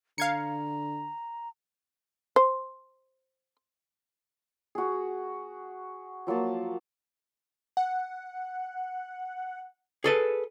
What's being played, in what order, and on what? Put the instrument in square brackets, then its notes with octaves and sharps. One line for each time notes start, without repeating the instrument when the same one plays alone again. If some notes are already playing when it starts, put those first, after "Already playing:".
[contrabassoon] D3 [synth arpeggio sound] F5 G#6 C#7 [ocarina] A#5
[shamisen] C5
[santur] F#4 G#4
F3 F#3 A#3 A5
[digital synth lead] F#5
[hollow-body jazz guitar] G#4 A4 B4